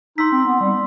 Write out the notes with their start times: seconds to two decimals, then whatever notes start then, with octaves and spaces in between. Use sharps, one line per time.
0.18 D#4 C6 E6 B6
0.32 C4
0.46 B3
0.60 G3